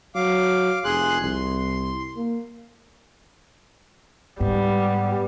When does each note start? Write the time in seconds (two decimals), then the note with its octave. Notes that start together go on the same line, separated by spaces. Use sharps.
0.15 F#3 F5 D6
0.84 F1 G#4 C6 F#6
1.22 C2 C6
2.16 A#3
4.41 G#2 G3 B3